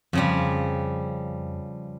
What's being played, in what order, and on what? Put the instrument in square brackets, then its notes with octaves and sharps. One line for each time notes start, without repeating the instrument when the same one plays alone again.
[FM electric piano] F2 [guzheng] C#3 F3 G3